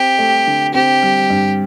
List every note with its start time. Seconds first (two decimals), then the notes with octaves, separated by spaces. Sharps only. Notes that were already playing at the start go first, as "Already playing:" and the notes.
Already playing: C4 G4
0.18 A3
0.47 D3
0.74 C4 G4
1.02 G3
1.30 G2